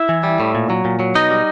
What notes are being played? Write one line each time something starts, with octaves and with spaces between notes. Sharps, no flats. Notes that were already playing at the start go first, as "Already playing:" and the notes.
Already playing: E4 E5
E3
G3
A2
A#2
F#3
A#2
F#3
B2 D#4 D#5
G3